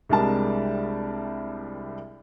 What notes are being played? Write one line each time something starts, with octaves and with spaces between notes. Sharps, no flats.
C2 G3 G#3 D4 A#4 A5